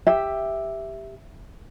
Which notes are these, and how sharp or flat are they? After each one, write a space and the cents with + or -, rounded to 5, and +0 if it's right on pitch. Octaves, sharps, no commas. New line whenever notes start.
G4 +10 E5 +0